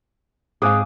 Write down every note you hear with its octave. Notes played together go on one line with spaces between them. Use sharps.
G#2 C4 G#4 F5 G#5 D6 D#6 F#6